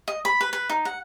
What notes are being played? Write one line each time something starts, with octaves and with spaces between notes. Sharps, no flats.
D#5
B5
B4
B4
D#4
F#5